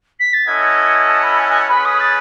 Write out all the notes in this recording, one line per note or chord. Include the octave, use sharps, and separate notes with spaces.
B6
A6
C#4 E4 A4 D#5 F#5 G#6
A5
B5
G#5
G#5
C#4 G#4 B4 B5
D#6
A6